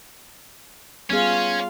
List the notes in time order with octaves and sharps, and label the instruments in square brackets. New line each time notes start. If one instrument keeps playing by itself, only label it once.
[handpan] G3 B3 G#4 [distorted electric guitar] C#4 [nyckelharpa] F4 F5